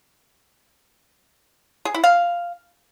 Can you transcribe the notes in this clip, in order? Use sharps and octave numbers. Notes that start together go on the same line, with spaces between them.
G#4
E4
F5